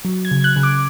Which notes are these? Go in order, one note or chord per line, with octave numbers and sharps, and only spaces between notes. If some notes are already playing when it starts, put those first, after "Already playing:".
F#3
G#6
C#3
F#6
C#3
D6